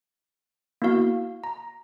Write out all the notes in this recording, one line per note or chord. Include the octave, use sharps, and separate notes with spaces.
A#3 B3 E4 F#4 F5
A#5